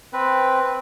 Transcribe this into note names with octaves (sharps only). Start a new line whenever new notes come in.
C4 B4